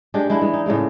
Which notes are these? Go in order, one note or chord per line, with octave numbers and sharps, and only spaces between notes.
G#3 D4 G4
G#3 D4 E4
E3 G#3
D#4
A2 C#3 G#3 A#3